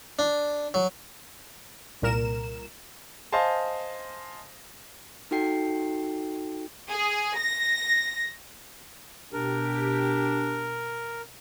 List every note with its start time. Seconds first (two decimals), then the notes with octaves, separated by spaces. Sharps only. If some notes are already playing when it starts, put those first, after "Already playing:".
0.19 D4
0.74 F#3
2.02 C2 A#2 A#4 E7
3.32 C5 D#5 F5 G#5 A5 C6
5.31 D#4 F#4 A4 G5 C7
6.89 G#4
7.38 A#6
9.33 B2 D4 G4 A#4